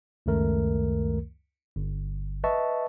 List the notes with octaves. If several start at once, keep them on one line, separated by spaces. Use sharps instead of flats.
C#2 F#2 D#3 A3 A#4
G1
B4 D#5 E5 A5 C#6